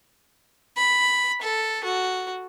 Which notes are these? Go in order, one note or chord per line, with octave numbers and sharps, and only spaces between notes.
B5
A4
F#4